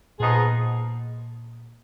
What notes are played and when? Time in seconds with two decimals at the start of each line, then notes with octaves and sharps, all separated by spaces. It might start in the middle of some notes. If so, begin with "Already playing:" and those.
0.20 A#2 F3 B3 D#4 G#4